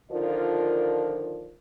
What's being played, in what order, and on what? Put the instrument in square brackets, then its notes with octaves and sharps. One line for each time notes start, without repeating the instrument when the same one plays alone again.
[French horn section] D3 D#3 F3 F4 A#4 D5